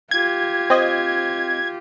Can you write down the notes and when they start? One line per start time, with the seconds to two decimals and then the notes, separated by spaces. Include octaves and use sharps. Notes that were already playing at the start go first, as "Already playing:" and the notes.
0.11 F4 G4 G#6
0.70 C4 D#5